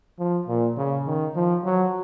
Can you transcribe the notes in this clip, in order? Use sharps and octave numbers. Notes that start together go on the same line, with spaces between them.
F3
A#2
C#3
D#3
F3
F#3